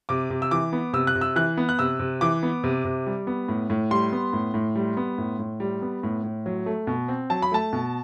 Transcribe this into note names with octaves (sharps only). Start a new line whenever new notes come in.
C3 D6
C3
E6
E3 D6
B3
C3 E6
F#6
C3
E6
E3 F#6
B3
F#6
C3 E6
C3
E3 D6
B3
C3
C3
G3
B3
A2
A2
G3 C6
B3
A2
A2
G3
B3
A2
A2
G3
B3
A2
A2
F#3
A3
B2
C4
F#3 A5
B5
A3 A5
B2